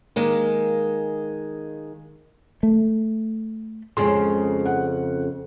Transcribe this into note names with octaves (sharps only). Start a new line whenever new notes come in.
D#3 G#3 A#3
A3
F2 C#3 G#3 C6
F#5